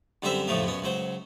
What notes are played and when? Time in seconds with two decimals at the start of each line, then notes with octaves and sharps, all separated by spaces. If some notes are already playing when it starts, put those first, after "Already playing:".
0.22 F#2 D3 G3 C4 C5 E5
0.47 F2 A2 C#3 F3 A3 A#3
0.64 F#2 B2 C#4
0.82 C#2 F#3 C5